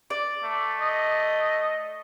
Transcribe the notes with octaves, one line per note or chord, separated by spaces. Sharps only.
D5
A3
D#5